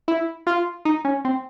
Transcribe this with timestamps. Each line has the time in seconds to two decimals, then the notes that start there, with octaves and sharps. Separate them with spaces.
0.08 E4
0.47 F4
0.85 D#4
1.05 C#4
1.25 C4